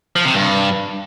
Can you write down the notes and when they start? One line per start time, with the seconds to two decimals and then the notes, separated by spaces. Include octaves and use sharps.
0.16 F3
0.25 C3
0.34 G2